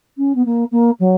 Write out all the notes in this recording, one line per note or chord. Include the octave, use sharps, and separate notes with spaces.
C#4
B3
A#3
A#3
F#3